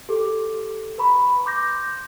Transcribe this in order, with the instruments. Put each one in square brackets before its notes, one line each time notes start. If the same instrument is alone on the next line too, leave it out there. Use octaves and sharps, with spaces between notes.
[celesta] G4 A4 D6
B4 A#5 B5 C#6
C6 D6 G6 A#6